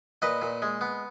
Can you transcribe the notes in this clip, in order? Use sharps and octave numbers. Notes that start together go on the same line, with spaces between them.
A#2 B4 D#5
A#2
G#3
B3